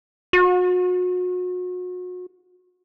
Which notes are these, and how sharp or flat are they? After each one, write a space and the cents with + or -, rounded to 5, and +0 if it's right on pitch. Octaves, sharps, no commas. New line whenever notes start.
F#4 -35